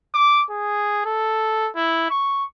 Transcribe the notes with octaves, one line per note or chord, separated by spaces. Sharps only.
D6
G#4
A4
E4
C#6